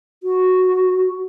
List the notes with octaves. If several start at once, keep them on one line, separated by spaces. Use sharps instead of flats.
F#4